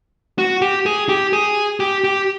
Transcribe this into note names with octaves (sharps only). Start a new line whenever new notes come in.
F#4
G4
G#4
G4
G#4
G4
G4